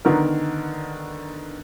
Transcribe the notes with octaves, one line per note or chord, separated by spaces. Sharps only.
D3 D#3 B3 A#4